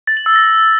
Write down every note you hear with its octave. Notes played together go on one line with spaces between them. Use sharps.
A6
F#7
E6
A#6